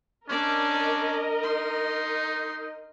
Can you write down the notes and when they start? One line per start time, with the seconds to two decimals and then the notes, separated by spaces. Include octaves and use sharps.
0.29 C#4 D4 A#4 D5 D#5
1.43 D#4 C6